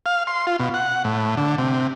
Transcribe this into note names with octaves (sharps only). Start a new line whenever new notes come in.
F5
C6
F4
B2
F#5
A2
D3
C3